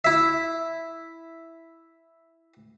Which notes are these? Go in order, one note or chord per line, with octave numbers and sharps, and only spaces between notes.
E4 E5